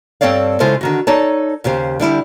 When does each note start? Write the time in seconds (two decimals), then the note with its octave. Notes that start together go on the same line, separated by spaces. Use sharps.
0.21 G2 C4 A4 C#5 D5 F5
0.60 C#3 G#3 E4 F4 A4 C5
0.81 D3 D#3 F#4
1.07 D#4 A4 C#5 D5 A5
1.64 D#2 C#3 G4 C5
2.00 D3 G3 E4 G4